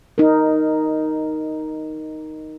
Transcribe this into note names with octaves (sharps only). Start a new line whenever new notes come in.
D#4 A#4